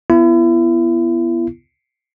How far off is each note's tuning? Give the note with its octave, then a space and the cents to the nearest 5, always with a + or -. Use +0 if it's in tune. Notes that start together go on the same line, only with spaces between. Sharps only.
B3 +0 E4 +35